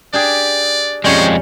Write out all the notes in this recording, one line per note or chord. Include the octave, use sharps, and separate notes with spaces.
D4 G4 G#4 D5
F2 G3 G#3 C#4 C5 C#5